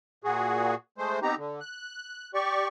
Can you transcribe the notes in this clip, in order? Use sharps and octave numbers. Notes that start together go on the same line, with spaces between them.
A#2 F#4 G#4
G#3 A3 C5
B3 C4 D#4 G4 A#5
D3
F#6
G4 D5 C#6